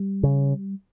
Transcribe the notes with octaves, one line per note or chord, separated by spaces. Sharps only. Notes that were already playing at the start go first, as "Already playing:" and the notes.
Already playing: G3
C#3